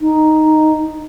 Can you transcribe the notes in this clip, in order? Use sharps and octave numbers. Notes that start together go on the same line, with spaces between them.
D#4